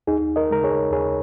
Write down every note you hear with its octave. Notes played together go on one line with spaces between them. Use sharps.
D#2 D#4 G#4
A#4 D#5
C#3 G#3 A#4
G#4 C#5
D#2 G#4 C#5